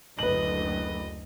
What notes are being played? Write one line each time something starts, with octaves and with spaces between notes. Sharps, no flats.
F#1 D2 B4 D#5 F#7